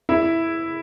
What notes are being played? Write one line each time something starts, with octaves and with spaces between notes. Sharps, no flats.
E4